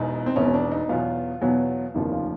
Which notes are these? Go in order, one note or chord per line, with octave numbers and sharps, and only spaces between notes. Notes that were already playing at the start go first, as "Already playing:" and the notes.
Already playing: E1 E2 B2 D#4
C4
E1 E2 B2 C#4
D4
D#4
E2 B2 F#3 B3 F4
E2 B2 F#3 B3
F1 D#2 C#3 F3 A#3 E4
F4